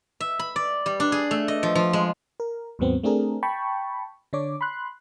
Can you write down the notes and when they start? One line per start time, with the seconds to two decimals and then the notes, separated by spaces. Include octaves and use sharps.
0.20 E5
0.39 B5
0.56 D5
0.86 G3
1.00 D4
1.12 G#4
1.31 A3
1.48 D#5
1.63 F3
1.75 F3
1.93 G#3
2.40 A#4
2.79 D#2 G#2 F#3 B3 C4
3.03 A3 C4 D4 G#4 A#4
3.43 G5 A5 B5 C#6
4.33 D3 D4 C#5 D6
4.61 B5 C6 F#6